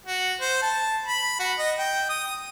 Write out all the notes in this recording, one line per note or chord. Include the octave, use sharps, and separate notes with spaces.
F#4
C5
A5
B5
F#4
D#5
G5
D#6